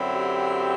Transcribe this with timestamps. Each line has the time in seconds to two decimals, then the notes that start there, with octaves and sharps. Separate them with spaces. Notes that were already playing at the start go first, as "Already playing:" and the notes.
Already playing: F#2 D3 F#3 C4 E4
0.15 G4